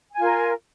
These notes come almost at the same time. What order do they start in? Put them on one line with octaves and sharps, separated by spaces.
G#5 F4 A#4